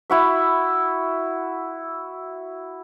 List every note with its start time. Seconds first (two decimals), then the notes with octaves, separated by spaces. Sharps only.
0.10 E4 F#4 E5